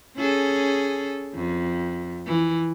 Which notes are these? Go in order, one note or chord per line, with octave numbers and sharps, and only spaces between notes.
C#4 G#4 A4
F2
E3